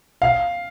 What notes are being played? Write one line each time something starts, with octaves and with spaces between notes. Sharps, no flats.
F5